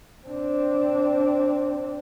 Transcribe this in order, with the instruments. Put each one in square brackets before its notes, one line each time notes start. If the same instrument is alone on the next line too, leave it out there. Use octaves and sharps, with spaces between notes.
[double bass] C4 D4